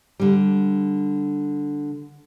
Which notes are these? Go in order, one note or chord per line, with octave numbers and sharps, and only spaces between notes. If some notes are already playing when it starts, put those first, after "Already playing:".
D3 G3